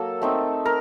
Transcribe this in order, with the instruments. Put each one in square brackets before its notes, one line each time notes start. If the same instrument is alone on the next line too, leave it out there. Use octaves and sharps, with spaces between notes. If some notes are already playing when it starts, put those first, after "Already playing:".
Already playing: [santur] F#3 A#3 A4
A3 C4 D#4
A#4